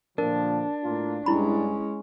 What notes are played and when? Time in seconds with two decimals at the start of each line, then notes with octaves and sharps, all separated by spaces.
0.18 A#2 D3 F3 D4 A#4
0.83 A2 A#3 F4
1.26 G2 G#3 C#4 E4 B5